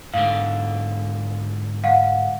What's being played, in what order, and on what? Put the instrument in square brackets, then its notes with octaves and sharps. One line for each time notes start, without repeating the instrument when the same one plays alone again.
[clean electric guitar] G#2 D3 [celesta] F5
[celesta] F5 F#5